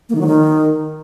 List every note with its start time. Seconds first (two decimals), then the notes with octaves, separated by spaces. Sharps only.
0.09 A#3
0.15 D#3
0.21 F#3
0.26 D#3